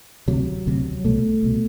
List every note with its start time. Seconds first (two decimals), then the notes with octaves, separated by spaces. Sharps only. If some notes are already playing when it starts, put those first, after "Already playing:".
0.28 D2 C3 F#3
0.67 D2 C3
1.04 C2 B2 A3
1.43 C2 B2